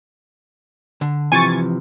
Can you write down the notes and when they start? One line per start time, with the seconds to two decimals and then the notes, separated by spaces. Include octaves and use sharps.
1.01 D3
1.32 C3 E3 F3 G#5 C#6 A6